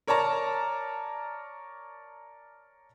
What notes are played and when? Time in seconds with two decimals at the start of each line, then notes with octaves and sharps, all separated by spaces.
0.08 A#4 C#5 D5 A5 A#5